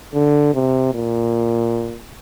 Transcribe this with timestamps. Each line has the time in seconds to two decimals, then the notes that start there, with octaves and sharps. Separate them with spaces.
0.14 D3
0.54 C3
0.93 A#2